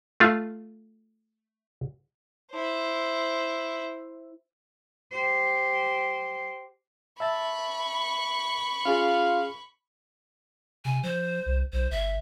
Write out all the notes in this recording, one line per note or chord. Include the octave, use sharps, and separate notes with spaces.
A3 F4
E4 C5
G4 C5
E5 A5 B5 C#6 A6
C#4 F4 G#4 F5
C3 G#5
F3 C5
C2
B1 C5
G1 E5